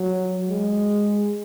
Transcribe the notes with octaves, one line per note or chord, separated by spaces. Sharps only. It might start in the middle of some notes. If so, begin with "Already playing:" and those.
Already playing: F#3
G#3